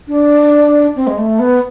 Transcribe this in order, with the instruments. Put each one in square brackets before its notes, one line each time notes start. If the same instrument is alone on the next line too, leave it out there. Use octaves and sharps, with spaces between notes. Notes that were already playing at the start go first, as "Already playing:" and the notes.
[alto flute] D4
C4
G#3
A3
B3